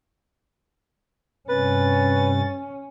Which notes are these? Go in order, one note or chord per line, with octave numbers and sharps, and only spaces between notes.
G2 C3 C#4 B4 A6